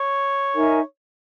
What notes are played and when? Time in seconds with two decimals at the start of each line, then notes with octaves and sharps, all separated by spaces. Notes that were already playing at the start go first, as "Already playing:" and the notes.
Already playing: C#5
0.55 D#4 A#4 E5 G#5